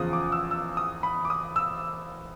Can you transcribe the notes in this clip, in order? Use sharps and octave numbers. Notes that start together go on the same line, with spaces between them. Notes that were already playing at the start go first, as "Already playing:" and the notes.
Already playing: E2 C#3 F3 D#6
D6
E6
E6
D#6
B5
D6
D#6
E6